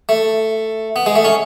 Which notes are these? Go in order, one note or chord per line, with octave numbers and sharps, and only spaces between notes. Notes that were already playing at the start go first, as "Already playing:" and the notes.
A3
B3
G#3
A3
C#4